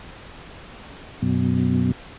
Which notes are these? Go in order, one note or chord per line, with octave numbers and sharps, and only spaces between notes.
F#2 B2